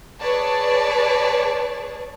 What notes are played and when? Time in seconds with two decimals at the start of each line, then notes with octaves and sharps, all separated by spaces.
0.19 G#4 B4 C#5 D5 A5